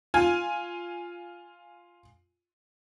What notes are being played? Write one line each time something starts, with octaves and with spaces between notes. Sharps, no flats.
F4 G#5